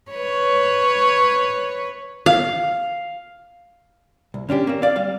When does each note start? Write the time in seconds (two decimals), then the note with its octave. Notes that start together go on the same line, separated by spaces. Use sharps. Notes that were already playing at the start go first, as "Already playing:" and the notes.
0.11 B4 C#5
2.26 F5
4.34 C2
4.49 D3 C#4 D4 G4
4.67 A#3 C4
4.82 D5 F5
4.96 G3 F5